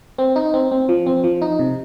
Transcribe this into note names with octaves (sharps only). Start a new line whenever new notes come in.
C4
D#4
C4
C4
F3
C4
F3
D#4
C3